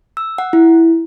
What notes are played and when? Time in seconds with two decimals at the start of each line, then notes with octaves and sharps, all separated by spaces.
0.17 E6
0.38 F#5
0.53 E4